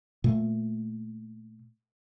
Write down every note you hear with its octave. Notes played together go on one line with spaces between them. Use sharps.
A#2 A3